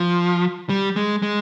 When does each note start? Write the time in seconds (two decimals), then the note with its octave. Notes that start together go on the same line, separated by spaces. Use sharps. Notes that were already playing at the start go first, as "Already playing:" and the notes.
Already playing: F3
0.69 G3
0.96 G#3
1.22 G#3